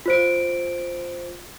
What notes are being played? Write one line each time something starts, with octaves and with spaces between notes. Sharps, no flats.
F4 C5 D7